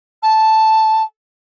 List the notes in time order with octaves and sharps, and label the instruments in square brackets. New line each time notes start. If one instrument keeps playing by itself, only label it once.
[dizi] A5